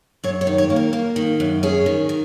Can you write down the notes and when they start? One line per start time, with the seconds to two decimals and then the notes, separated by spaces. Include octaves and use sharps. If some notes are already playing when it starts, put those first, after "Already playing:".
0.24 F#2 C#5
0.41 C#5
0.47 D#3
0.58 C#5
0.70 A#3
0.76 A#4
0.93 A#3
1.16 D#3
1.40 F#2
1.63 C#4 G#4
1.86 D#3
2.09 D#3